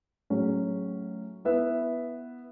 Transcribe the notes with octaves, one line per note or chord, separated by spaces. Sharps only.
A2 F#3 C#4 G#4
B3 E4 B4 E5